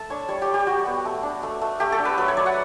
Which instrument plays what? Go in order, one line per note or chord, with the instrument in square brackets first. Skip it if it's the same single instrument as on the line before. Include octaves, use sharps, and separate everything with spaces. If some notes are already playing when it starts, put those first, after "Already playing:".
Already playing: [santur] A3 E4 A5
D4 C#5
G3 C#5
G4
G3
G4
G3 F#4
B3
A3
D4
A3
A3
A3 G4
A4
D4
B4
F#3 B4
C#5
F#3 D5
F#5